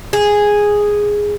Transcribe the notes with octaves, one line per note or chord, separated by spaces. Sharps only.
G#4